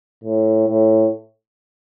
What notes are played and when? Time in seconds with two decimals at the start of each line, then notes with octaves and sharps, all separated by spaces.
0.24 A2
0.68 A2